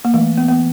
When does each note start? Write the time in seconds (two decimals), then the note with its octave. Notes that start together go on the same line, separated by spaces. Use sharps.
0.05 A#3
0.14 E3 A3
0.38 B3
0.48 B3